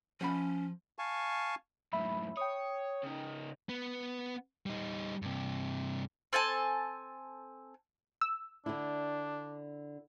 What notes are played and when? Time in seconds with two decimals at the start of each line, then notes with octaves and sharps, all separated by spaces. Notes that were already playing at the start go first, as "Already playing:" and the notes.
0.21 F3 C#4 F#5 B5
0.99 F5 G#5 A5 C#6
1.93 F#2 A2 E5 B5
2.37 C#5 G5 D#6
3.03 C#3 D#4
3.69 B3
4.66 G3 D#4
5.22 G2 C3
6.33 C4 A4 G#5 A5
8.21 E6
8.66 D3 D4 E4